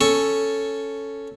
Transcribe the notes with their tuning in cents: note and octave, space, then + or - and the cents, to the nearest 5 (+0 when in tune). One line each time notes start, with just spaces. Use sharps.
C#4 +0 A4 +0 C#6 +0